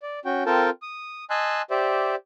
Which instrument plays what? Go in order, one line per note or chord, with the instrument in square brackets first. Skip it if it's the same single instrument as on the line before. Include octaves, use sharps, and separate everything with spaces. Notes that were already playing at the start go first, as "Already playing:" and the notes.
[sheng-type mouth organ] D5
C#4 F#4 G5
C4 F4 A4 A#4 G5 A5
D#6
D#5 G#5 A5 C6 E6 F#6
G4 C5 D5 E5